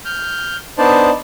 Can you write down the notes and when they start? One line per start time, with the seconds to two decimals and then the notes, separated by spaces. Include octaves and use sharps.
0.05 F6 G6
0.78 B3 D4 D#4 C5 D5 A5